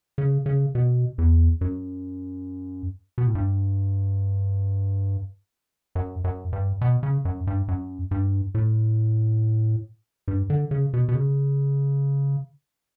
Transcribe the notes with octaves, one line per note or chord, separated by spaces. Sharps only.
C#3
C#3
B2
E2
F#2
B2
A2
G2
F#2
F#2
G2
B2
C#3
F#2
G2
F#2
G2
A2
G2
D3
C#3
B2
B2
C#3